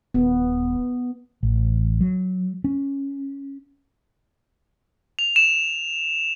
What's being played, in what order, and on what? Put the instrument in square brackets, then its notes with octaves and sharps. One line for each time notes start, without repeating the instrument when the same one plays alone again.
[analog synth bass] D#1 [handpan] B3
[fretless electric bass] A1
F#3
C#4
[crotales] F7
E7